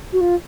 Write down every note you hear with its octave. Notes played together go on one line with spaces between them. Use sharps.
F#4
F4